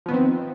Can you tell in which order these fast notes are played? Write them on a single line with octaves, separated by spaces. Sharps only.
F3 B3 D#3 C4